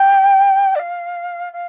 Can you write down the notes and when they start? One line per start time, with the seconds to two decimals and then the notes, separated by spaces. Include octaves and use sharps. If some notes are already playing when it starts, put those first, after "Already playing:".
Already playing: G5
0.75 D5
0.79 F5
1.52 F5